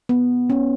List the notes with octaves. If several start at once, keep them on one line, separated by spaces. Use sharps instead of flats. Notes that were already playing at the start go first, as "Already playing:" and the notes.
B3
C#4